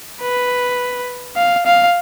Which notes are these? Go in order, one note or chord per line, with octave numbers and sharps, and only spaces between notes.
B4
F5
F5